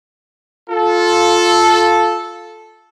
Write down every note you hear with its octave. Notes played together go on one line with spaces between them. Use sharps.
F4 A4